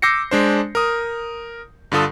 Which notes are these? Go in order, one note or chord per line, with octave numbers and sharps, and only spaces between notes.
D6 E6 G6 A#6 C7 C#7
G#3 D4 C5
A#4 D#6
G2 D3 F4 A4 D#6